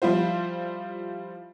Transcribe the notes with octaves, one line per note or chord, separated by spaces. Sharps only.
F3 G3 E4 F4 C5